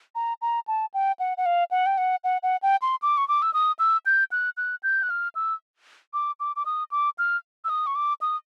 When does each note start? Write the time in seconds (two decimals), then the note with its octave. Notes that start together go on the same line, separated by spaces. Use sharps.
0.15 A#5
0.42 A#5
0.68 A5
0.94 G5
1.19 F#5
1.38 F#5
1.46 F5
1.71 F#5
1.86 G5
1.98 F#5
2.24 F#5
2.43 F#5
2.63 G5
2.82 C6
3.02 D6
3.17 C#6
3.28 D6
3.42 E6
3.54 D#6
3.79 E6
4.06 G6
4.32 F#6
4.57 F#6
4.83 G6
5.03 F#6
5.10 F6
5.35 E6
6.14 D6
6.40 D6
6.56 D6
6.66 D#6
6.92 D6
7.19 F6
7.65 E6
7.69 D#6
7.87 C#6
7.95 D6
8.21 D#6